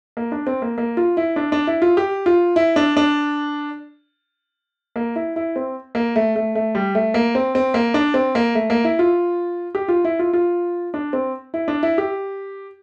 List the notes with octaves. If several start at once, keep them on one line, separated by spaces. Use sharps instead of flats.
A#3
D4
C4
A#3
A#3
F4
E4
D4
D4
E4
F4
G4
F4
E4
D4
D4
A#3
E4
E4
C4
A#3
A3
A3
A3
G3
A3
A#3
C4
C4
A#3
D4
C4
A#3
A3
A#3
E4
F4
G4
F4
E4
F4
F4
D4
C4
E4
D4
E4
G4